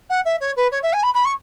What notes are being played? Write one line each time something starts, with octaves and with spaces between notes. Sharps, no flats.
F#5
E5
C#5
B4
C#5
E5
G#5
B5
B5
C#6